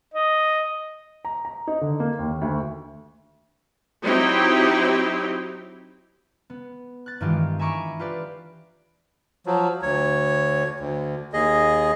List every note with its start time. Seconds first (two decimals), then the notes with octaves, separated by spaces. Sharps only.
0.14 D#5
1.25 A#5
1.45 A#5
1.67 D#4
1.81 D3
2.00 A#3
2.19 D#2
2.41 D2
4.03 F#3 C4 D#4 E4 G4 G5
6.50 B3
7.06 F#6 A6
7.20 G2 D#3 E3 G#3 F4 G4
7.59 E5 G#5 A#5 B5 C#6 D6
7.99 F4 G4 B4 D5
9.46 F3 F#3
9.83 D2 C#5
10.80 D2
11.33 D#2 G#4 D#5